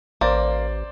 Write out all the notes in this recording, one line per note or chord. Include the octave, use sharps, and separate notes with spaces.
A1 A#3 C5 D5